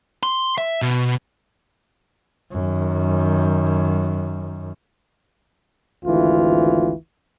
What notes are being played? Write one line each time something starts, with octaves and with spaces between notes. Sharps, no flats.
C6
E5
B2
F#2 D#3
G#1 D2 E3 F4